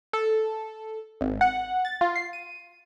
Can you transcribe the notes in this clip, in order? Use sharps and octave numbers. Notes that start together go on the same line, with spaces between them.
A4
G#1
F#5
A6
F4
C7
D#7